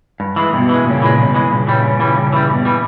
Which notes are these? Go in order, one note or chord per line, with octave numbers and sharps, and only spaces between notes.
G2
E3 G#3
G2 B2
E3 G#3
G2 A#2 C#3
E3 G#3
G2 B2
E3 G#3
G2 A#2 C#3
E3 G3
G2
E3 G3
G2
E3 G3
G2 B2
E3 G3